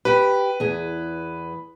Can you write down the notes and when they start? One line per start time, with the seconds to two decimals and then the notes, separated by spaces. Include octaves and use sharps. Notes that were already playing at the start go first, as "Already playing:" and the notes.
0.05 G4 B4 G5
0.60 E2 G#4